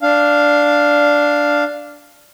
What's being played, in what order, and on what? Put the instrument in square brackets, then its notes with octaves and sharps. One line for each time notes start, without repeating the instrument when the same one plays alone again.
[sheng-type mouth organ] D4 F5